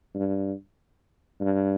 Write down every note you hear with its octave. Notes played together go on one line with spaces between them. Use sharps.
G2
G2